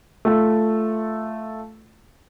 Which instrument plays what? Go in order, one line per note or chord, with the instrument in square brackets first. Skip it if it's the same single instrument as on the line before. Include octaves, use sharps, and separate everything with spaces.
[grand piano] A3 F4 A4